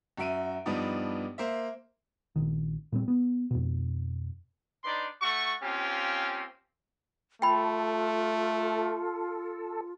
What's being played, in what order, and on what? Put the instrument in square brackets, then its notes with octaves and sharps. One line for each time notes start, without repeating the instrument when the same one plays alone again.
[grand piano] F#2 F#4 E5 D7 D#7
G2 F3 B3 D4 D#4
A#3 C5 E5
[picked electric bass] A#1 D#3
A#2 G3 C4
B3
F2 B2
[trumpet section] D4 D#4 B4 D5 C6
A3 F#4 C#6
A#3 C4 C#4 F4 G4
[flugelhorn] A3 [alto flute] F4 [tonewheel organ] A4 [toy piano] G5 B5